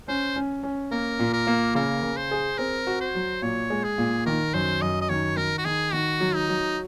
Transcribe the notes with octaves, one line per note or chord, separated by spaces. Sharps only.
C#4 C5
C#4
C#4
A#3 A#4
A#2
A#4
A#3
C#3 A#4
C#3
C5
G#4
C4 A#4
F#4
C5
F#3
A#2 C#5
G#3
G#4
A#2
D#3 A#4
F#2 C5
F#2 D#5
D#5
D#3 C#5
D#3 A#4
F#4
D#3 G#4
D#3 F#4
F#3
D#4
F#3